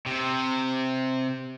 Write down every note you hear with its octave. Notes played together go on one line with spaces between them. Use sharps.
C3